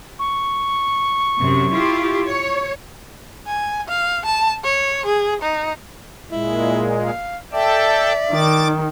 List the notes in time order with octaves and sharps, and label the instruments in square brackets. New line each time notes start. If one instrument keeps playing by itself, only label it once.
[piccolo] C#6
[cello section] F#2 C3
E4 F4 G4
C#5
[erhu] G#5
F5
A5
C#5
G#4
D#4
[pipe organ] A#2 G#3 [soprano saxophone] E4
[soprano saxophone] F5
[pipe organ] A4 G5 A5 [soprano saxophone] D5 [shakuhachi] E5
[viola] D#3 [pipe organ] D6 A6